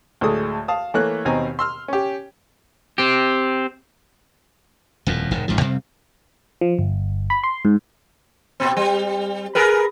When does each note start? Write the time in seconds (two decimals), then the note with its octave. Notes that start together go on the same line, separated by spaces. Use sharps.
0.21 D2 A2 G#3 A4 D#6
0.68 F5 A5 D#6
0.94 E3 A3 A#3 C#5 F#6
1.25 D#2 B2 C4 D#4 G#5 A#5
1.59 C6 E6 F6
1.88 C#4 G4
2.98 C4 G4
5.06 D#1 F2 A2
5.31 E1 G#2 D#3
5.48 F1 G#2 C#3 F3
5.61 F2 C3 G3 C4
6.61 F3
6.79 G1
7.30 B5
7.44 C6
7.65 G#2
8.60 A#2 C4
8.77 G3
9.55 G#4 A#4 B4